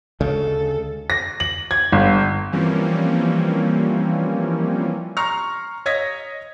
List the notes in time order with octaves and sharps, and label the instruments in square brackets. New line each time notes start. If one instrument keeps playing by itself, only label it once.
[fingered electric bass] D2 C#3 G#3 [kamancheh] A4
[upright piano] A#6
F#7
G#6
G1
[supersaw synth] E3 F3 G3 A#3 C4 C#4
[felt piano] A#5 C6 C#6 F6
C#5 D#5 D#6 G#6 A#6 B6